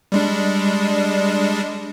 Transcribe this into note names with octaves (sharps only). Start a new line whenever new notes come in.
G3 G#3 D4